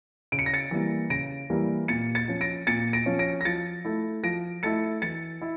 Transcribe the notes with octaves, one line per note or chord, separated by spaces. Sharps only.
C#3 D7
C#7
A#6
A6 C#7
E3 G3 A#3
C#3 A#6 D7
E3 G3 A#3
A#2 A6 C#7
A6 C#7
F3 C#4
A#6 D7
A#2 A6 C#7
A#6 D7
F3 C#4
A#6 D7
A#6
F3 A6 C#7
A3 E4
F3 A#6 D7
A3 E4 A6 C#7
E3 A6 C#7
E4